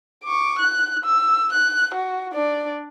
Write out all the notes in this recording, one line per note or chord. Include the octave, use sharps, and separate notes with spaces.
C#6 D6
F#6
E6
F#6
F#4
D4 D5